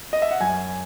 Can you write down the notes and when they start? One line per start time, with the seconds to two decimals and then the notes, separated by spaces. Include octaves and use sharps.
0.13 D#5
0.22 E5
0.31 F#5
0.41 F#2 G#5